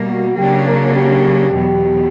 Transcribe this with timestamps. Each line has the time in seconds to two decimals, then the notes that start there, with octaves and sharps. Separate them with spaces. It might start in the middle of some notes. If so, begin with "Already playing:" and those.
Already playing: B2 G3 A#3
0.08 F#4
0.37 C#3 F#3 A#3 D4 G4
0.66 A#4
0.95 G4
1.53 E2 B2 F#3 B3